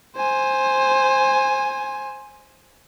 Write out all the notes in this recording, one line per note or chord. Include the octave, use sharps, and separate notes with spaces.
C5 G#5